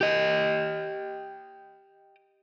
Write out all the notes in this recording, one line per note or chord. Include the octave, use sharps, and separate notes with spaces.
G4 D#5